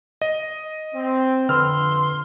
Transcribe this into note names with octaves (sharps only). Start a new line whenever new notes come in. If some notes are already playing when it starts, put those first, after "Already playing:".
D#5
C4
F2 D3 B4 C6 E6 F6